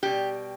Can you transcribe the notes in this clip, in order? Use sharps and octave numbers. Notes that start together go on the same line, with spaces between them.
B2 G3 G4